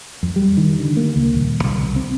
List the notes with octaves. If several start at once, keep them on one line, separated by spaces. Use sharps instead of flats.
F2
G3
D#3
D3
A#3
C#2
D#1
C2
C2
C4